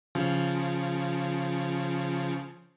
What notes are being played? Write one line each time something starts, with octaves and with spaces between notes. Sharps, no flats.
C#3 F3